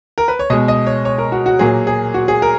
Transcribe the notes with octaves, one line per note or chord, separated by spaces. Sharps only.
A#4
B4
C#5
B2 G#3 D#5
D#5
C#5
C#5
A#4
F#4
F#4
A#2 F#3 A#3 G#4
G#4
F#4
G#4
A#4